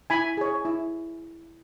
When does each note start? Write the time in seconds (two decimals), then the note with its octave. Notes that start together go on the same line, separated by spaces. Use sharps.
0.10 E4 G#5 B5
0.37 G#4 C#5
0.65 E4